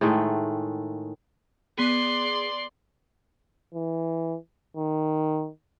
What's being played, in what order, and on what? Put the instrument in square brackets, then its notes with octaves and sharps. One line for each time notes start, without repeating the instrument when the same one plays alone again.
[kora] A2 D#3 G#3 A3
[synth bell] B3 G#4 [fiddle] D5 C6
[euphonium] E3
D#3